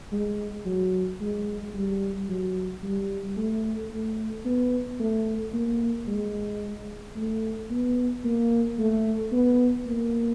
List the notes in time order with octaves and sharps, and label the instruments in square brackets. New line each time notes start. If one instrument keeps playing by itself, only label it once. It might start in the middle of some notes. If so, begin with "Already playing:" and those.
[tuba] G#3
F#3
G#3
G3
F#3
G3
A3
A3
B3
A3
A#3
G#3
A3
B3
A#3
A3
B3
A#3